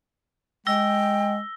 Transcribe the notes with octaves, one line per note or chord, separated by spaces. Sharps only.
G#3 G5 E6 A#6 G7